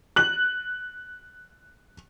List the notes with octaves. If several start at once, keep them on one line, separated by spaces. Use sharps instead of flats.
F#6 F#7